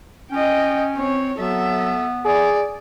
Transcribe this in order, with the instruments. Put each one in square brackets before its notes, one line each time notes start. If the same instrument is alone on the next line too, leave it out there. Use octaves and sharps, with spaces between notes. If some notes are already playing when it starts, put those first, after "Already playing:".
[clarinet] C#4 [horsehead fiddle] D#5 G5
[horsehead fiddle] C4 C#5
[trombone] F#3 [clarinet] B3 [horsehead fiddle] A4 E5
[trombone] G#4 [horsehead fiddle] D5